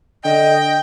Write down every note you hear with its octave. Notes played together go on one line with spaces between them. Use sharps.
D3 D#5 G5